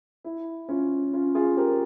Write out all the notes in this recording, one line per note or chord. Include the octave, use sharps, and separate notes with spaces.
E4
C#4 F4
C#4 F4
F4 G#4
G4 A#4